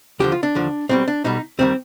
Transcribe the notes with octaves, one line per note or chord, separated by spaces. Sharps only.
D#2 D3 F3 G4
F4
D4
D#2 D3 F3
B1 B2 G3 C4
D4
B1 B2 G3 D#4
D#2 D#3 G3 C4